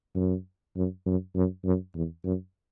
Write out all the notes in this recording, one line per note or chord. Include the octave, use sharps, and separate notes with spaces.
F#2
F#2
F#2
F#2
F#2
E2
F#2